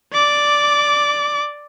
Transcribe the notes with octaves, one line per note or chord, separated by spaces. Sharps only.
D5 D6